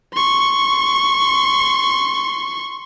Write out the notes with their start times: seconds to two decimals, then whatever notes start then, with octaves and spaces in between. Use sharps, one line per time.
0.14 C6 C#6